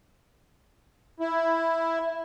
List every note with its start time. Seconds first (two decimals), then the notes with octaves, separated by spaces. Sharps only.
1.20 E4